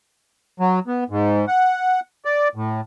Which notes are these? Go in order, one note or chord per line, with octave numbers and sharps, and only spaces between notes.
F#3
B3
G#2
F#5
D5
A2